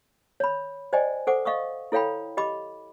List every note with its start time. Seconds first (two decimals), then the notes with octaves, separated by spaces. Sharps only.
0.40 C#5 B5
0.93 C5 D5 D#5 G5 G#5
1.27 A4 C5 F#5 D6
1.45 D#5 F5 C#6 D#6
1.92 E4 A4 C#5 F5 G5 B5
2.37 G4 D#5 B5 D6